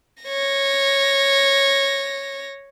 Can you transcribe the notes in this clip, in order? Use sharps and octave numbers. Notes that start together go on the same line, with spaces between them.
C#5 A#6